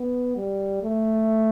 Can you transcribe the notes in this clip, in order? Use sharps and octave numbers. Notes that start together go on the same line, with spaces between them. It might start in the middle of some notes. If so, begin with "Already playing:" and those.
Already playing: B3
G3
A3